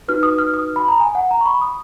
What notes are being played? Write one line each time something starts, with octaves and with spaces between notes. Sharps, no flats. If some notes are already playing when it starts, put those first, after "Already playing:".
D#4 F#4 B4 F6
D#6
F6
D#6
B5
A#5
G#5
F#5
A#5
C#6
B5
D#6